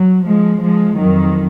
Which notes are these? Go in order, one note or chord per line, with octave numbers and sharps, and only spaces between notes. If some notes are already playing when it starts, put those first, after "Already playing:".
Already playing: F#3
F3 G#3
F3 G#3
F2 D#3 F#3